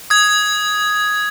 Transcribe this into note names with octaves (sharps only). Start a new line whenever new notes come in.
D#6 G#6